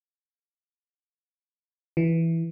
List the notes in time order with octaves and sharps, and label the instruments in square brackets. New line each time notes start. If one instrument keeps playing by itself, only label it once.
[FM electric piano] E3